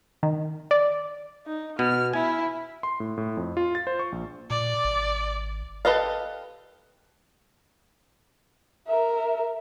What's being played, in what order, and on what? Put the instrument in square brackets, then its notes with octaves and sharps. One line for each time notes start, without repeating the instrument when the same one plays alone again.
[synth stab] D#3
D5
[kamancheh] D#4
[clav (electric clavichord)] B2 B3 [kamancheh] F6
[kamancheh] E4 [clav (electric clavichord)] G#5
[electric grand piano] C6
A2
A2
F2
F4
A6
C5
C#6
A#1
[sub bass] A#2 [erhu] D5
[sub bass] G#1
[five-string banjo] G4 A4 B4 D#5 F5
[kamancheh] A#4 E5